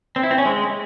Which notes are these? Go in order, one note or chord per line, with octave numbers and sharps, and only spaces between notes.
C4
E4
C4
C#4
G#3